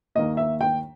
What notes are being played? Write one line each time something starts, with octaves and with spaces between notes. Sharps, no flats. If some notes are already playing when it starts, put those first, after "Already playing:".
D#2 D#3 A#3 D#5
E5
G5